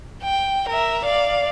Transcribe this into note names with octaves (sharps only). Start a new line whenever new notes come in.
G5
A#4 E5
D5 F5